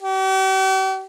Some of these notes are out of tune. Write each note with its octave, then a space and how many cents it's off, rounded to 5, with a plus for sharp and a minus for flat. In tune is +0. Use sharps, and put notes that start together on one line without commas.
G4 -45